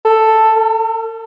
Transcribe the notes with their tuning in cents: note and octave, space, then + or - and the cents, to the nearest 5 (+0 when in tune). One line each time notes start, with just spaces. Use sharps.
A4 +5
A4 +45